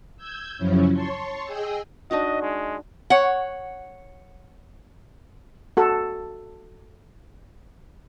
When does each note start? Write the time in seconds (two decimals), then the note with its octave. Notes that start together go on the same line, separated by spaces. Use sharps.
0.17 E6 G6 G#6
0.58 F#2 C#3 F3 F#3 C#4 E4
0.93 C#5 A5 C6 C#6
1.45 G#4 D#5 G5 G#5 E6
2.11 D4 D#4 F#4 D#5
2.42 G#3
3.10 C#5 F#5
5.77 F#4 A4